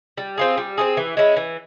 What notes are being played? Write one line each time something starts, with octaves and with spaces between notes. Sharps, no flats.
G3
C4 F4 G#4
G3
C4 F4 G#4
E3
G#3 C#4 E4
E3